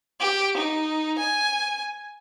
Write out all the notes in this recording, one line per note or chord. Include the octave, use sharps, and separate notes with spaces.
G4
D#4
G#5